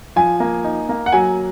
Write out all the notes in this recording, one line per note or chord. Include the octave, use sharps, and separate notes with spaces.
F3 G#5
A#3
D#4
A#3
F#5
F#3 G#5